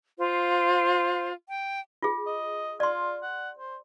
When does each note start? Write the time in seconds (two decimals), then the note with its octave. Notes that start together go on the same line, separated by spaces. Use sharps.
0.19 F4 C5 F5
1.49 G5
2.02 F4 G#4
2.26 D#5
2.80 F4 D5 C6
3.22 F#5
3.59 C5